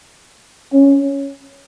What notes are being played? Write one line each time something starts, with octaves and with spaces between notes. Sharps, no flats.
C#4